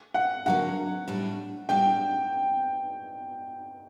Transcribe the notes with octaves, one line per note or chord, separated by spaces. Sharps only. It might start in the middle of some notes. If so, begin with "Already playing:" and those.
F#5
D3 F#3 A#3 F#5
A2 G3 D4
A2 G3 D4 G5